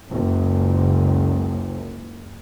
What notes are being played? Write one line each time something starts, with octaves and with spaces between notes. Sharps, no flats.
F#1 C#2